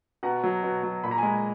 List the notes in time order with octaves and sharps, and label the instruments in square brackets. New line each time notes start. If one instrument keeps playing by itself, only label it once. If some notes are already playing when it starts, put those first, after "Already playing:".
[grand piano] B2 F#5 A#5
F#3
B2
F#3
A#2 B5
A#5
G#5 B5
G#3